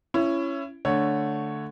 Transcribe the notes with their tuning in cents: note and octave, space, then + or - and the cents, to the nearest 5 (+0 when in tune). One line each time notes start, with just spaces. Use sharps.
C#4 +0 E4 +25
D3 +0 A3 +0 C#5 +0